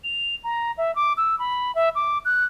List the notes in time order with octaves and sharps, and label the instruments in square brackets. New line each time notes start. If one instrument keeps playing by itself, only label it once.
[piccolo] F7
A#5
E5
D6
E6
B5
E5
D6
F#6